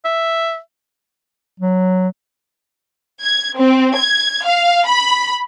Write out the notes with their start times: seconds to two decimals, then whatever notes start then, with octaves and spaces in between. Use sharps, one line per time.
0.05 E5
1.60 F#3
3.22 G#6
3.57 C4
3.97 G#6
4.45 F5
4.88 B5